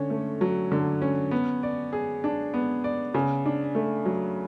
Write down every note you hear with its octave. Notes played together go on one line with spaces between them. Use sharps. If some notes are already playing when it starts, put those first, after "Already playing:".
Already playing: D3 C#4
A3
F#3
D3
C#4
B3
D5
G#4
D4
B3
D5
C#3
D4
A3
F#3